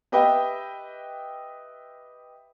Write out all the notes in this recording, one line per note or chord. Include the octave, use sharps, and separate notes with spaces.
G4 B4 D#5 E5 G5